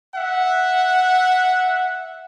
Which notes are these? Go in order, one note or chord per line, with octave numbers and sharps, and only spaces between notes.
E5 F#5